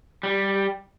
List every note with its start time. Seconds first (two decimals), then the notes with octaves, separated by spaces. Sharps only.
0.23 G3